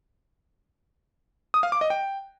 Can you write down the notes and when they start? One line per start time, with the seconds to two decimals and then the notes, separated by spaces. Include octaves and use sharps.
1.54 D#6
1.63 F5
1.72 D6
1.81 D#5
1.90 G5